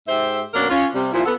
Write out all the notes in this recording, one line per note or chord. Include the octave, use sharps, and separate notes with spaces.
G#2 G4 C5 E5
F#2 B2 A#3 D4 A#4 C#5
C#4 F4
C3 G3 C4
A#2 F3 E4
B3 A4